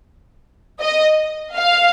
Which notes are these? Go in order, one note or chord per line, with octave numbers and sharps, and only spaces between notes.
D#5
F5